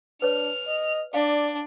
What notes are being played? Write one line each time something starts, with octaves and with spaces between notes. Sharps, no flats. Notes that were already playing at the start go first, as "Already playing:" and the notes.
D4 B4 C#5 F6
D#5
D4 D5 F5